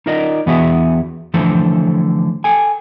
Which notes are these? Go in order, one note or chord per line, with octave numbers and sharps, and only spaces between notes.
D#4 F4 A#4 D5 D#5
E2 E3 B3 F#4 G#4 E5
D3 E3 F3 A3 A4 C5
A4 G5 G#5